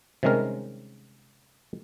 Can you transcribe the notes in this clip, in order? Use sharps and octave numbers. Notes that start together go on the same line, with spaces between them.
C3 D#3 G3 G#3 C#4 A#4